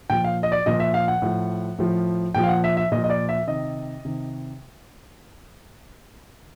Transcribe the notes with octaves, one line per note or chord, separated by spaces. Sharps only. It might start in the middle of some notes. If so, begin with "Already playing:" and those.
A#2 F3 G5
F5
D#5
D5
A#2 F3 D#5
E5
F5
F#5
A2 F3
A2 F3
A#2 F3 G5
F5
F#5
E5
E5
A#2 F3 D#5
D#5
D5
E5
C3 D#3 D#5
C3 D#3